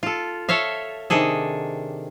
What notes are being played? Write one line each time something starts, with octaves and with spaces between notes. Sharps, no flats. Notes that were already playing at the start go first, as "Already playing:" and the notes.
F4 A4
A4 C#5 E5 F5
C3 D#3 D4 G#4 A4